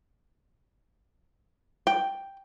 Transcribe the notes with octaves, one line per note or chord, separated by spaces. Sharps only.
G5